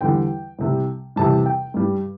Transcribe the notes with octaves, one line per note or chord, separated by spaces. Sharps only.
E2 D3 G3 G5
C2 C3 G3
E2 C3 G3 A5
G5
G2 G3